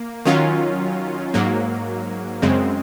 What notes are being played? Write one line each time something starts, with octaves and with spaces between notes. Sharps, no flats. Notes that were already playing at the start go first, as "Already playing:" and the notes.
Already playing: A#3
D#3 F#3 C#4 F4
G#2 F#3 A#3
F#2 C#3 G#3 C4